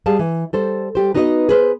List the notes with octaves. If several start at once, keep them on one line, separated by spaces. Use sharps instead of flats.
G3 G#4 F5 A5
E3
G3 A4 C5
G3 G4 C5
B3 D#4 F#4 B4 C#5 D#5
G#4 B4 C5